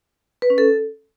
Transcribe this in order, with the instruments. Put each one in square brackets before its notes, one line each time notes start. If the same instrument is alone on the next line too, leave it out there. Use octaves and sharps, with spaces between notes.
[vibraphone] B4
C#4
A4